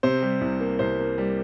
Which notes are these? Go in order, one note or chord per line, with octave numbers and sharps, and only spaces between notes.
C3 C5
G3
C2
A#3
C2 C5
A#3
G3